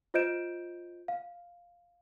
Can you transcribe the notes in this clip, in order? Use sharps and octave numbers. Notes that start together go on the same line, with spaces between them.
F4 C5 D#5 G6 D7 E7
F5